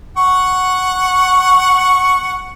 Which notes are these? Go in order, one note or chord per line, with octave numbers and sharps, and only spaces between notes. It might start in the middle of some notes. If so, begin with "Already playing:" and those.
F#5 C#6